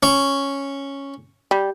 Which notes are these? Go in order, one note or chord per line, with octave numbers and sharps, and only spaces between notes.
C#4 C#6
G3